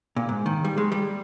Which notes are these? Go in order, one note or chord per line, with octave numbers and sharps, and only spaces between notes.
A#2
G#2
D#3
G3
G#3
G3